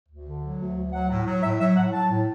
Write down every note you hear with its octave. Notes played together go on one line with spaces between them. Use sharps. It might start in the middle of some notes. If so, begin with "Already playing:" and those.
D2
D3
F#3
D2
D2
F#3 F#5
A2
F#3
A2 E5
F#3 E5
A2 F#5
F#3 A5
A2